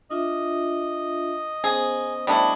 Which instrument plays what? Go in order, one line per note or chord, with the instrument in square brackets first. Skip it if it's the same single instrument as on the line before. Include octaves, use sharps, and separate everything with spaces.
[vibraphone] D4 F4 E5 [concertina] D#5
[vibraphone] B3 C#4 C5 [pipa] G#4
[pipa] G3 A3 E4 [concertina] D4 D#5